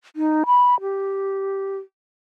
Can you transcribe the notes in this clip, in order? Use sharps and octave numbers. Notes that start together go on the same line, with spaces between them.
D#4
B5
G4